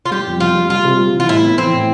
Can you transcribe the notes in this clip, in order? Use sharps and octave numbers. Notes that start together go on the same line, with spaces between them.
F4
G3 G4
F2
F2 F4
G3
G3 F4
C3
G3
E3
F4
A2 E4
B3
E3 C4
A2